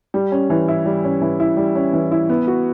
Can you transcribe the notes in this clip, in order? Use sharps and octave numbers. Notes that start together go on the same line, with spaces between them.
G3
C#4
E3
E4
G3
C#4
E3
E4
G3
C#4
E3
E4
B3
F#4